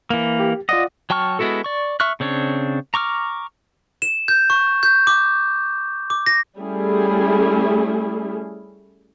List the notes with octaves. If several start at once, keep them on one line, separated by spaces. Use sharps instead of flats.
E3 A#3
G4
F4 D5 D#5 F#5
F#3 G5 A5 C#6 F6
G#3 B3 E4 F#4 A4
D5 C#6
E5 C#6 F6 F#6
C#3 C4 D4 C#5
A#5 C#6 D6 F6
E7
G6
C#6
G6
D6
D6
A#6
G3 A3 C#4 E4 G#4